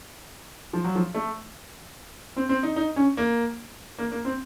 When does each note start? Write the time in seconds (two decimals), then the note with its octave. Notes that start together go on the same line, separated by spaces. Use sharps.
0.73 F3
0.84 F#3
0.95 F3
1.15 A3
2.36 C4
2.49 C4
2.63 D#4
2.76 D#4
2.96 C#4
3.17 A#3
3.98 A#3
4.12 A#3
4.25 C4